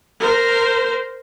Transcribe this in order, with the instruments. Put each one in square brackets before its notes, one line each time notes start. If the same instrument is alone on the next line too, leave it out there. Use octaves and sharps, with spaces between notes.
[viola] A#4 C5